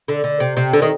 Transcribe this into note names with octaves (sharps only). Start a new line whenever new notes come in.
D3
D3
C3
C3
D3
D#3